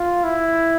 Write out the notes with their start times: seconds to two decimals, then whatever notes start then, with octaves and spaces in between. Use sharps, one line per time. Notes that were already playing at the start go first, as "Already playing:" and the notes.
Already playing: F4
0.24 E4